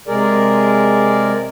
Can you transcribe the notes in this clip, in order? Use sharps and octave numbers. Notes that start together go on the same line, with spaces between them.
C3 G#3 G#4 A#4 D5